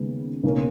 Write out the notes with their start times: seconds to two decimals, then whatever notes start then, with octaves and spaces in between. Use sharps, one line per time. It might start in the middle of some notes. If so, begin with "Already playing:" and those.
Already playing: D#2 C#3 G#3 B3
0.44 C#2 B2 A#3 C#4